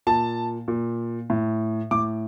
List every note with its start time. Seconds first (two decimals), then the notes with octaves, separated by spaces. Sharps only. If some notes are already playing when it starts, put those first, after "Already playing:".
0.07 A#2 A5
0.68 A#2
1.30 A2
1.91 A2 D6